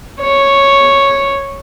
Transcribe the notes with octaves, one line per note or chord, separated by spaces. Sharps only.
C#5